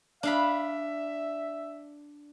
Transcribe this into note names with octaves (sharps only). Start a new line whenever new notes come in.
D4 E5 F5 B5